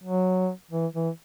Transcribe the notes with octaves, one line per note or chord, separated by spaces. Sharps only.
F#3
E3
E3